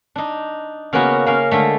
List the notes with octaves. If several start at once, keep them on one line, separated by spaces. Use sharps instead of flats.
D4 D#4
C#3 A#3 B3 C#4 F#4
A#3 C#4 F5
D3 G#3 A3